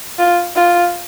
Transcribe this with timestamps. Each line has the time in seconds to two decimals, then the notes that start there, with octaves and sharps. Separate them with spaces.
0.19 F4
0.56 F4